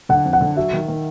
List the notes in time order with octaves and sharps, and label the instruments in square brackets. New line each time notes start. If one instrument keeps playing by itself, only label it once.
[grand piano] D3 [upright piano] F#5
[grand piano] F2
[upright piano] F#5
[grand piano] D3
[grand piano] F#3 [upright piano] E5
[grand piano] D#3
D#3